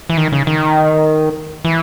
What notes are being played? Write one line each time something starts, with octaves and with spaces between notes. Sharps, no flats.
E3
D#3
C#3
D#3
E3